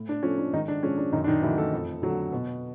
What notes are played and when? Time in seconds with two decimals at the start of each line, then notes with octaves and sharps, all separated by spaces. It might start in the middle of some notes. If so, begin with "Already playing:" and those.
Already playing: A2
0.09 D4
0.23 F3 A3 C#4
0.38 D4
0.53 G#2 D#3 D#4
0.68 D4
0.83 F3 G#3 C#4
0.97 D4
1.13 F#2 D#3 D#4
1.24 D4
1.28 D#3 D#4
1.42 D3 E3 F#3 A3 E4
1.58 A3 A4
1.73 F2
2.02 D3 F#3 A3
2.32 B2